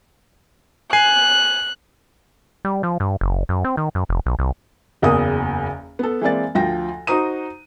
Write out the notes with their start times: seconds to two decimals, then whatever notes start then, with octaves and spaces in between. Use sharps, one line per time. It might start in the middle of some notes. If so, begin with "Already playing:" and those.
0.93 G#5 F#6 C7
2.65 G3
2.83 F3
3.00 G2
3.21 F#1
3.49 F#2
3.64 C4
3.77 D#3
3.95 F#2
4.09 F1
4.26 B1
4.39 C2
5.02 F#1 E2 C#3 A#3 D#6
5.99 B3 A4
6.21 E3 G#3 A#3 C4 D5 A6
6.55 D2 F3 G5 A#6
7.07 D#4 F#4 C5 A#5 D#6 D#7